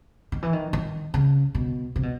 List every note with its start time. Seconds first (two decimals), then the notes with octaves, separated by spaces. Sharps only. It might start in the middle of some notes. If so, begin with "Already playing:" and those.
0.32 D#3
0.42 E3
0.53 D#3
0.73 D#3
1.14 C#3
1.55 B2
1.96 C3
2.03 B2